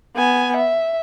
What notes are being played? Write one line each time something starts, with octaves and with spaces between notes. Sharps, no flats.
B3 G#5
E5